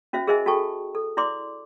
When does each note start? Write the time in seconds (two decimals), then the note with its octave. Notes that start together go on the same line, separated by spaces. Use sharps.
0.13 C#4 F#4 C5 E5
0.27 G#4 A#4 C5 D#5 E5 G#5
0.46 F#4 A4 G5 A5 C#6
0.95 A4
1.17 E4 D5 C6 D6